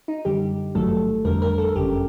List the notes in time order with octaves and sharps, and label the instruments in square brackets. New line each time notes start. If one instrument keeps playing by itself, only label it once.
[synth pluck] D#4
F#2 D3 G3 G4
G#1 G2 D#3 F#3 A3 A4
F2 D3 G3 A#4
A#4
A4
G1 F#2 C#3 G4